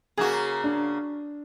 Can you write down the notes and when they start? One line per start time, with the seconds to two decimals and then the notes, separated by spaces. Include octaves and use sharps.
0.17 C#3 A#3 F#4 G#4
0.64 D4